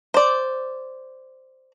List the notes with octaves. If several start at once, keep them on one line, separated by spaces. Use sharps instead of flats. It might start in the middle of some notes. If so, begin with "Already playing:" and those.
C5 D5